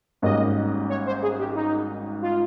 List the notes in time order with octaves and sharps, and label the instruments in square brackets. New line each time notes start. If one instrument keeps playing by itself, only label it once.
[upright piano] G#1 G#2 G3 A#3 C#4 [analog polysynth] D#5
[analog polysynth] C#5
C5
G#4
G4
D#4
F4